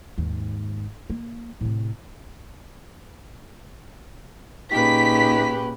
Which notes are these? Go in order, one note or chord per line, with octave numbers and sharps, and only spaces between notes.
D#2 G#2
A#3
A2 C3
A#2 C#3 D#4 G4 B4 B6